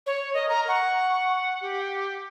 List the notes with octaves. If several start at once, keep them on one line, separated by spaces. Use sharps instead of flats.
C#5
A#4 D#5
A#4 A#5
F#5 C#6
G4